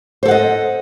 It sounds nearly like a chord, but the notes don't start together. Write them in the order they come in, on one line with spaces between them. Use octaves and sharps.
C5 A4 F#5 D#5